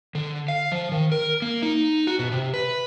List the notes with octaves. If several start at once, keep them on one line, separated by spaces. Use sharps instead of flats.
D3
F5
F3
D#3
A#4
A#3
D#4
F#4
B2
C3
B4